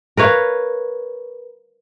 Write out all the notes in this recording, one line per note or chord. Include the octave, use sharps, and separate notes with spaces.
A#4 B4 C#5 F5